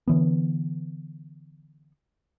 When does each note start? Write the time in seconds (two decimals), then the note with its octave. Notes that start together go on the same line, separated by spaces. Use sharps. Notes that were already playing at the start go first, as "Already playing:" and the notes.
0.08 D3 E3 B3